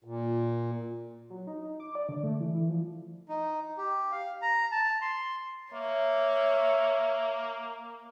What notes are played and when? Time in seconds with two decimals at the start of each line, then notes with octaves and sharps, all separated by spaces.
0.04 A#2
1.30 F#3
1.47 D#4
1.62 D#4
1.80 D6
1.95 D5
2.09 D3
2.23 A3
2.40 E3
2.54 E3
2.69 F3
3.29 D#4
3.78 G4
4.12 F5
4.42 A#5
4.72 A5
5.02 C6
5.74 A#3 C#5 E5